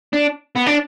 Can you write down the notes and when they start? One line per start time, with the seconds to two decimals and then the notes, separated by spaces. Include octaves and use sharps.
0.13 D4
0.56 B3
0.66 D4